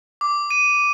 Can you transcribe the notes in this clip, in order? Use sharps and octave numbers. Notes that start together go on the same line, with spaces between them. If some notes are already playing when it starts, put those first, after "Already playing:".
D6
D#7